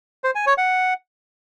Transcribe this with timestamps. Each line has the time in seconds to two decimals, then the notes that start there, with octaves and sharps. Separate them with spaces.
0.24 C5
0.35 G#5
0.46 C#5
0.58 F#5